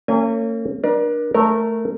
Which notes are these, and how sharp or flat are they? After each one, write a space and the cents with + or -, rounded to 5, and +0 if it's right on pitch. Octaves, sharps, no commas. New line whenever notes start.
A#3 -45 C#4 +0 G#5 -20
D4 +15 A#4 +35
A3 +0 A#4 -15